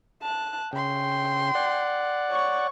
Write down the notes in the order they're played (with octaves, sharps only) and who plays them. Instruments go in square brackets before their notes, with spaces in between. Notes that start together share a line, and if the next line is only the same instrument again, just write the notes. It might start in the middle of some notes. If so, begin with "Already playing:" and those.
[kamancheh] A5 F#6
[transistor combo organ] C#3 [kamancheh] G5 C6
[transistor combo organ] D5 F#5
[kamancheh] C#5 C#6